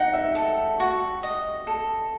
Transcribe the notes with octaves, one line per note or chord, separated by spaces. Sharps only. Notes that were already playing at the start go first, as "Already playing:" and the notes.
Already playing: D#4 F#5 G5
E5
A4
F#4
D#5
A4